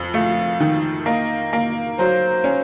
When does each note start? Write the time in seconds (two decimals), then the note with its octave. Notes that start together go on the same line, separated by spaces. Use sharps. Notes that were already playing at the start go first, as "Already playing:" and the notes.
Already playing: F2
0.14 A3 F5
0.60 D#3
1.06 A#3 D#5
1.53 A#3
1.98 F#3 C5
2.44 C#4